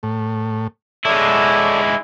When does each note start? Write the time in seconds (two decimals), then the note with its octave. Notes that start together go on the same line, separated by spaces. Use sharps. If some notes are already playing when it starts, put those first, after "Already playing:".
0.03 A2
1.05 G#3 E4 A4 C#5 D5